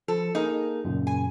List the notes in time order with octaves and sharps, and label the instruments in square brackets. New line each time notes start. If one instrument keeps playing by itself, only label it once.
[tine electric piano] F3 [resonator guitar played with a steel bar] A4
[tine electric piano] A#3 G#4 A#4 [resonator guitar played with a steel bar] D#4
[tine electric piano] F#2 A#2 C#3
[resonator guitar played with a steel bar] G#5